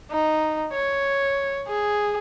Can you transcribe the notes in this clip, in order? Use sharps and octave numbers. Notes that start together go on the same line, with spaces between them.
D#4
C#5
G#4